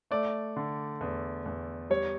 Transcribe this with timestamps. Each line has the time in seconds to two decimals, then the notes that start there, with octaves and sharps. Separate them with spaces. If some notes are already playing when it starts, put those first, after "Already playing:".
0.11 A3 D5
0.56 D3
1.01 E2
1.46 E2
1.90 G3 C#5